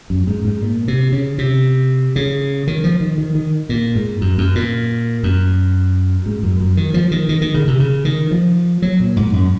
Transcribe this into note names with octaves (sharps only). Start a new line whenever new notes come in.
F#2
G#2
G#2
A#2
C3
C#3
C3
C#3
D#3
F3
D#3
D#3
D#3
A#2
G#2
F#2
F#2
A#2
F#2
G#2
F#2
F#2
D#3
F3
D#3
D#3
D#3
C#3
C3
C#3
D#3
F3
F#3
A#2
G#2
F#2